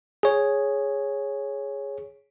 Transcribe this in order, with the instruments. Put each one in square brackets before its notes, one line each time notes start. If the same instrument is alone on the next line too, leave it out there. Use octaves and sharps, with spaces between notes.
[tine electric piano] G#4 C#5